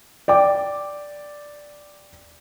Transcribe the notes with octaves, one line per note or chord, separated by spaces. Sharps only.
D5 G5 D6